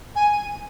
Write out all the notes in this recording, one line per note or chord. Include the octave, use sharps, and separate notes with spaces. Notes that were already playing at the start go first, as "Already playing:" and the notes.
G#5